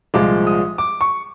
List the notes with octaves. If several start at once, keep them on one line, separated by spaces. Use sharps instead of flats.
C2 A#2 F3 G#3 D6
D#6
D6
C#6